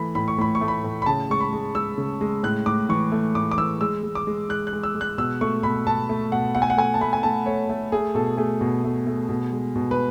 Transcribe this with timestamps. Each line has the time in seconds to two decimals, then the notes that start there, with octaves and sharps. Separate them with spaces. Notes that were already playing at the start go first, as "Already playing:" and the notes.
Already playing: E3 A3 B5
0.15 A2 B5
0.28 C#6
0.38 A2 B5
0.55 C#6
0.61 A3
0.68 B5
0.84 A2
1.02 B5
1.06 C#3 A5
1.30 G#3 C#6
1.40 B5
1.53 G#3
1.75 G#3 E6
1.98 C#3
2.21 G#3
2.43 A2 F#6
2.66 A2 D6
2.89 E3 C#6
3.12 A3
3.35 A2 D6
3.51 D6
3.58 E3 E6
3.81 G#3 E6
4.03 G#3
4.15 D6
4.27 G#3
4.49 G#3 F#6
4.67 F#6
4.73 G#3
4.83 E6
4.95 G#3
5.01 F#6
5.18 B2 E6
5.41 A3 C#6
5.63 B2 B5
5.86 B2 A5
6.09 A3
6.32 B2 F#5
6.55 A3 F#5
6.62 G#5
6.70 F#5
6.77 A3 G#5
6.94 A5
7.01 A3 B5
7.13 G#5
7.23 A3 A5
7.46 A3 C#5
7.69 A3
7.92 A3 G#4
8.15 B2 A4
8.37 A3 G#4
8.61 B2
8.84 A3
9.07 A3
9.29 B2
9.52 G#3
9.76 B2
9.91 B4